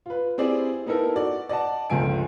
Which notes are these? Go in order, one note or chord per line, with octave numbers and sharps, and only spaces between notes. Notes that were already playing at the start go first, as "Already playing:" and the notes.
F4 B4
C4 E4 G4 G#4 C5 D5
B3 D#4 E4 A4 A#4
F#4 D5
D5 D#5 F#5 A5
G1 C#2 F3 G#5 D7